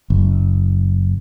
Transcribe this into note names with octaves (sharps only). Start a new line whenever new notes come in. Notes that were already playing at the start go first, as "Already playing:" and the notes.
F#1